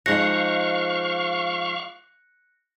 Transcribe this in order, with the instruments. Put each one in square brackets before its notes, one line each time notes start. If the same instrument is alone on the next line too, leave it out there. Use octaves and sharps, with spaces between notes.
[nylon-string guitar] F3 G#3 D#4 [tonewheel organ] F5 C#6 [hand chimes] F#6 A#6 C#7